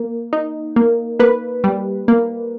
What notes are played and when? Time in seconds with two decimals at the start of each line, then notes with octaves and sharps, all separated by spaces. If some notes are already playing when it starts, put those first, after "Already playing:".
Already playing: A#3
0.33 D#4
0.76 A#3
1.19 A#3 B4
1.64 G3
2.08 A#3